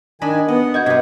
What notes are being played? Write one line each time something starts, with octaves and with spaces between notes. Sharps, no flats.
D#3 D4 D#5 G#5 B5
B3 D#5 F#5
F#4 D#5 G6 G#6
G2 C3 B3